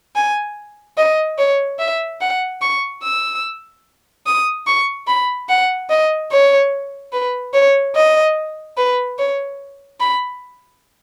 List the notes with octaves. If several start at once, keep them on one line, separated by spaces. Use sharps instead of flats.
G#5
D#5
C#5
E5
F#5
C#6
E6
D#6
C#6
B5
F#5
D#5
C#5
B4
C#5
D#5
B4
C#5
B5